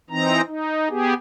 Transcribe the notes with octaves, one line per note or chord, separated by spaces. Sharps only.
E3 C4 D#4 A#5
D#4
B3 G4 G#4